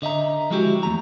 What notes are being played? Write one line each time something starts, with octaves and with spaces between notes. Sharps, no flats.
D3 D#5 E5 A#5
F3 G#3 E4 F#4 G4
E2 A3 A#5